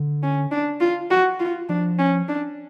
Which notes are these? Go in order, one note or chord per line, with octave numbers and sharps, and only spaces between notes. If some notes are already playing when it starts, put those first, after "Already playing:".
Already playing: D3
C#4
D4
F4
F#4
F4
F3 D4
C#4
D4